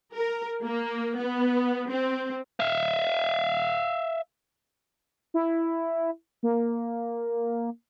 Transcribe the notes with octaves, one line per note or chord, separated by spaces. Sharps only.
A#4
A#3
B3
C4
E5 F5
E4
A#3